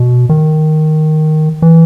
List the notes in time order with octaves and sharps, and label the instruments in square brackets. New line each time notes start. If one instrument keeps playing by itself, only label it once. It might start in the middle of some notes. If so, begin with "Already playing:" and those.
Already playing: [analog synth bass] B2
D#3
E3